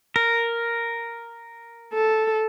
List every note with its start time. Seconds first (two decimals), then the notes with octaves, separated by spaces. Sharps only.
0.16 A#4
1.94 A4